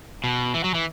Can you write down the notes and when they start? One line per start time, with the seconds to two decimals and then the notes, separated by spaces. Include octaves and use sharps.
0.24 B2
0.54 E3
0.64 F#3
0.74 E3